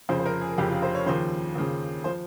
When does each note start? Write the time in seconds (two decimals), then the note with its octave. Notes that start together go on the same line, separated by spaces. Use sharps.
0.09 F1 F2 C#3 F3 C5
0.19 C5
0.26 A#4
0.41 G#4
0.58 F1 F2 C#3 F3 G4
0.70 F4
0.82 C5
0.95 C#5
1.06 D#2 C#3 F3 C5
1.55 D#2 C#3 F3
2.04 F3 C5